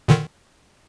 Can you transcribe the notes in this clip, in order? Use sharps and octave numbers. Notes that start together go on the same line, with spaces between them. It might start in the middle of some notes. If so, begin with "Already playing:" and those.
A#2 D3 D#3